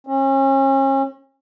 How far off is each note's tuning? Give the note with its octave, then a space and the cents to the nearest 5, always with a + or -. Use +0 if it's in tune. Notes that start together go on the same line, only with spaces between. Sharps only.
C#4 -35